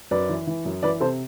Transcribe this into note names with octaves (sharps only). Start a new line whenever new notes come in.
F#2 B4 D5
E3
E3
F#2
E3 B4 D5
C3 A4 C5